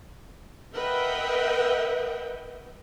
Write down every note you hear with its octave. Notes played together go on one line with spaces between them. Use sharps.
A#4 B4 D#5 E5 F#5 G5